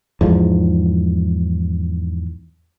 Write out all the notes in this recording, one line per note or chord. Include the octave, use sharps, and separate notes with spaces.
E2 G#2 F3